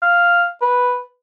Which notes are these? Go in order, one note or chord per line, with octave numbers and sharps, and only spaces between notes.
F5
B4